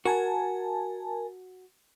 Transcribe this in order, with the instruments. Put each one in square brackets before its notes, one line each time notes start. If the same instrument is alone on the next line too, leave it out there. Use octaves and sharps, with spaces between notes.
[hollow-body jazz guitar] F#4 [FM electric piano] A#4 G#5 A5